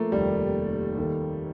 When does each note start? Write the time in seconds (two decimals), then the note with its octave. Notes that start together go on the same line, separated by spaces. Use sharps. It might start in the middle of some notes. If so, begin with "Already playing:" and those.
Already playing: F3 A3 A#3
0.12 F1 D#2 D#3 G3
0.97 D#2 D#3 A3